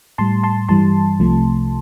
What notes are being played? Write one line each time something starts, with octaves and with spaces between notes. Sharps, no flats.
A2 G3 A5 C6
A5 C6
G2 E3 G3 A5 C6
C2 C3 F3 A3